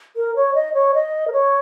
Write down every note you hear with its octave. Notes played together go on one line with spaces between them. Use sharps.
A#4
C#5
D#5
C#5
D#5
A#4
C#5